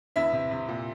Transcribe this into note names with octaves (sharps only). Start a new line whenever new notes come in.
E2 E4 E5
C3
C3
A#2